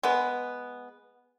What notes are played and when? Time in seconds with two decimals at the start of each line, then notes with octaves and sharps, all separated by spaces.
0.03 G#3 B3